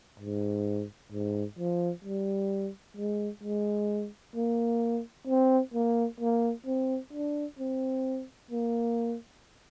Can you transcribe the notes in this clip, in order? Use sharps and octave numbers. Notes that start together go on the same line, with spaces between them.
G#2
G#2
F3
G3
G#3
G#3
A#3
C4
A#3
A#3
C4
D4
C4
A#3